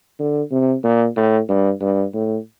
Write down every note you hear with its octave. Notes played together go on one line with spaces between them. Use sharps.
D3
C3
A#2
A2
G2
G2
A2